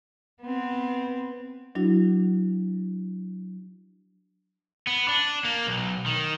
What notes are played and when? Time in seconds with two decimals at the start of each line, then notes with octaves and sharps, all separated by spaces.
0.41 B3 C4
1.75 F#3 D4 E4 F#4
4.87 B3
5.08 D4
5.44 A#3
5.67 B1
6.06 D#3